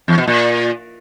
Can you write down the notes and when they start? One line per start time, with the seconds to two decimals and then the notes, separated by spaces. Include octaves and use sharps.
0.08 E2
0.18 B2
0.27 A#2